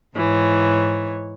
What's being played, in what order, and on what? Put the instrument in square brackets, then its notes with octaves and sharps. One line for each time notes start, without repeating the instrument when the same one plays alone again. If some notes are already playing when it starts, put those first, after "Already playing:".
[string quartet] G#2 E3 C#5